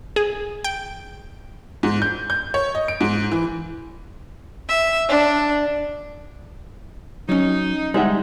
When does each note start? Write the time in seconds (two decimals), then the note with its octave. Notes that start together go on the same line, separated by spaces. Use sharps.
0.16 G#4
0.64 G5
1.83 G#2
2.02 G6
2.30 G6
2.54 C#5
2.75 D#5
2.88 D7
3.01 G#2
3.31 E3
4.68 E5
5.08 D4
7.29 F#3 C#4 D#4
7.94 G3 G#3 D#4 E5 F#5